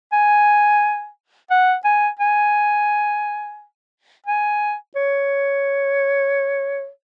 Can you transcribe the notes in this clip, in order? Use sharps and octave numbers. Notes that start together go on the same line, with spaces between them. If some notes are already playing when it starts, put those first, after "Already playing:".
G#5
F#5
G#5
G#5
G#5
C#5